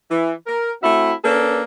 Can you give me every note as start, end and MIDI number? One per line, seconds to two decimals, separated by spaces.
0.11 0.32 52
0.47 0.71 70
0.82 1.13 57
0.82 1.13 60
0.82 1.13 64
0.82 1.13 66
0.82 1.13 76
1.24 1.62 58
1.24 1.62 61
1.24 1.62 62
1.24 1.62 69
1.24 1.62 71